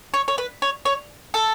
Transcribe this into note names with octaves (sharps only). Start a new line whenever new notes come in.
C#5
C#5
B4
C#5
C#5
A4